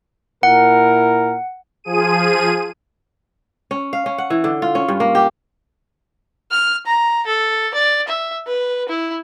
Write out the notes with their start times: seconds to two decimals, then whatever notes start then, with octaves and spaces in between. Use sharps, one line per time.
0.43 A#2 E4 A#4 F#5
1.84 F3 G#4 D#7
3.71 C#4
3.93 F5
4.06 C#4
4.18 F#5
4.30 E3
4.44 D3
4.62 F4
4.75 C#4
4.88 G2
5.00 A#3
5.15 G4
6.51 F6
6.86 A#5
7.26 A4
7.74 D5
8.08 E5
8.46 B4
8.89 E4